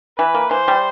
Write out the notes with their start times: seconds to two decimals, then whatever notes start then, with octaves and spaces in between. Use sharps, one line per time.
0.18 E3 B4
0.34 A#3
0.51 E3 C5
0.68 G3